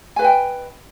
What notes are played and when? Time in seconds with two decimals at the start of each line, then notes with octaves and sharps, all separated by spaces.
0.16 G#5
0.19 B4
0.22 D#5
0.24 G5